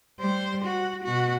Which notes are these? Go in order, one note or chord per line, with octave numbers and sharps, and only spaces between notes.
G3 C5
F#4
B2 F#4